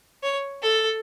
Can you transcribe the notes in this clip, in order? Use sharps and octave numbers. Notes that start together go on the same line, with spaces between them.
C#5
A4